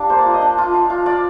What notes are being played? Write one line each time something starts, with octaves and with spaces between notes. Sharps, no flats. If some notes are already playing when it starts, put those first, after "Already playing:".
Already playing: G3 D4 F5
A#3 C5
D5
F4
D#5
D4
F4
F4
F4
F4 D5